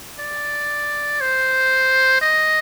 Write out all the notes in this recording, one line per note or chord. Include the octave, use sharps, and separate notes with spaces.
D5
C5
D#5